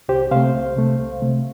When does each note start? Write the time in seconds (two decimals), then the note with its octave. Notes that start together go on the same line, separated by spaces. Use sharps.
0.09 C2 G4 C5
0.31 C3 A3 C5 F5
0.54 C2
0.76 C3 A3
0.99 C2
1.22 C3 A3